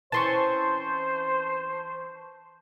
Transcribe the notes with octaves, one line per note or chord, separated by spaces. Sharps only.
E3 C4 C#4 C5 A5 C6 C#6